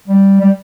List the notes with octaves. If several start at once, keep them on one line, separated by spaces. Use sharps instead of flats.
G3
G3